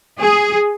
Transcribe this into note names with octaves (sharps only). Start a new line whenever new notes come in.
G#4